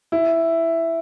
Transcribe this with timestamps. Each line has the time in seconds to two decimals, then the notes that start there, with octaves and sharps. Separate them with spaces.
0.12 E4